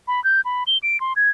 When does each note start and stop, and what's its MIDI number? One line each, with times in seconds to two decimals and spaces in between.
0.08 0.23 83
0.24 0.41 91
0.45 0.64 83
0.67 0.78 103
0.83 1.00 98
1.00 1.13 84
1.16 1.30 92